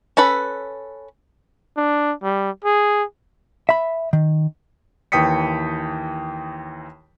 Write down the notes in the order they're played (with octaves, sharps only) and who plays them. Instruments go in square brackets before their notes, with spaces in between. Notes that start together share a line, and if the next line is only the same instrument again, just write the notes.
[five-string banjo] C#4 A4 B4 B5
[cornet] D4
G3
G#4
[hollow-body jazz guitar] E5 B5
D#3
[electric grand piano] D#2 E3 G5 D#6 B6 C#7